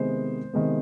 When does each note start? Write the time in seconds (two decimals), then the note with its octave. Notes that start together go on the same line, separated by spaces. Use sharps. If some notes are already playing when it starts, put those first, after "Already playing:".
Already playing: C3 D#3 G#3 B3 C5
0.54 C3 D#3 G#3 B3